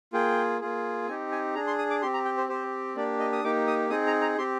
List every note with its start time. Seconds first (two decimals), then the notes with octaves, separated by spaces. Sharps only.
0.13 A#3 F4 G#4 G5
0.61 A#3 F4 G#4
1.07 C4 D#4 G4 G#5
1.32 G#5
1.55 D4 G#4 A#5
1.67 C6
1.79 D#6
1.90 D6
2.02 C4 G4 C6
2.14 A#5
2.25 G5
2.37 C5
2.49 C4 G4 C5
2.96 A#3 D4 G4 D5
3.19 D#5
3.32 D#6
3.43 A#3 D#4 G4 D6
3.67 D#6
3.90 C4 D#4 G#4 D#6
4.07 A#5
4.22 A#5
4.38 C4 G4 C6